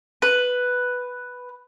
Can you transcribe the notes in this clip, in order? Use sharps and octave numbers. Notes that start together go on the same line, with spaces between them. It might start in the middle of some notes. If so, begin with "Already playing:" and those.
B4